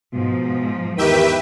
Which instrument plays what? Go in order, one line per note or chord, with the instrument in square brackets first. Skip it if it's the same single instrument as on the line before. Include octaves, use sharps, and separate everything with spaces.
[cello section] G#2 F3 [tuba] B2
[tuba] E2 [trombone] D#3 [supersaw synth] G4 E5 G5 [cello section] B4